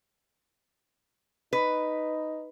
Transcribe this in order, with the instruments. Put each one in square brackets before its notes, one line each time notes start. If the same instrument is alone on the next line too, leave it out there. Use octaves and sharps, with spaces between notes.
[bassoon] D#4 [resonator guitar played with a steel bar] B4